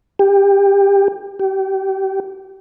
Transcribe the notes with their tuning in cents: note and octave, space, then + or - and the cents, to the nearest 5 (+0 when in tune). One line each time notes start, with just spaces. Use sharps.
G4 +20
G4 -30